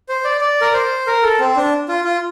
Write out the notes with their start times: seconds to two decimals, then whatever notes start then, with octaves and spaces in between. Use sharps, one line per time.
0.09 C5
0.25 D5
0.41 D5
0.61 A#4
0.74 C5
1.07 A#4
1.23 A4
1.39 C4
1.56 D4
1.89 F4
2.05 F4